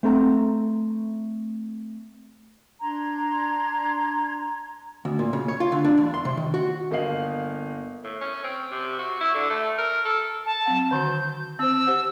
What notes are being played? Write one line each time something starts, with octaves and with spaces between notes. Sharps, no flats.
A3 C4 A4 A#5
D4 A#5 C6 G#6
D2
A#2
C#3
C#5
F4
D3
D4
E2
C6
C3
D#3
F#4
G1 A#3 D#5 F5 C7 F#7
A2
C#4
C4
C3
F#4
E4
D3
A3
A#4
A4
A5
F#3 C4 F#5
D3 D#3 F#4 G6
C4 C5 E6
G4 C5 F#5